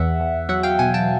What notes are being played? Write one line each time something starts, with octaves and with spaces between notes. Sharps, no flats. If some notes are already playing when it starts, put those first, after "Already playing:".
Already playing: E2 E5 F#5
E2
F#3 E5 F#5
F5 G5
B2 F#5 G#5
G5 A5